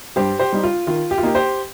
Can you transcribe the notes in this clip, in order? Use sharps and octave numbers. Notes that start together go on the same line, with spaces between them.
G2 G4 C5
G4 C5
G3 D#4
F4
D#3 F4
G4
F4
A#3 D#4 G4
G4 C5